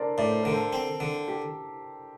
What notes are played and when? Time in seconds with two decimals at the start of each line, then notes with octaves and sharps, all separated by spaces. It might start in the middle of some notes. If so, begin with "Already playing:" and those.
Already playing: D4 A4 A#4 C5 D5
0.18 A2 D5
0.29 C5
0.42 D3 A#4
0.52 A4 C5
0.73 C4
1.00 D3
1.28 G4